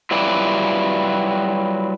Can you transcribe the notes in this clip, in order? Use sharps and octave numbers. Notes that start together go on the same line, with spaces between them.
F#3 G3 E4 F4 B4 D5